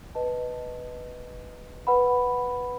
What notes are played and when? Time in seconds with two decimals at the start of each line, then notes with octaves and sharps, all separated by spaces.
0.15 B4 D#5 A5
1.87 B4 F#5 B5